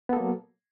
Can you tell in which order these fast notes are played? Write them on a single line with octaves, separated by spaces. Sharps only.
B3 A4 A#3 F#3